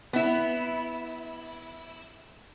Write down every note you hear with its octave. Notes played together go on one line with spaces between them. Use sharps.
B3 E4